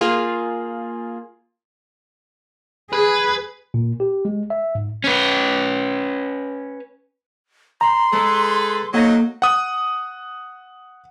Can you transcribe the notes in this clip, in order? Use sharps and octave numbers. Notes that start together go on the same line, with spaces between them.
A#3 F4 G#4
G#4 B4
A#2
G4
G#3
E5
G#2
C#4 B4
A#5 C6
G#3 G#4 A4 B4
F#3 A#3 D#4 A4 D#5 F#5
F#5 D#6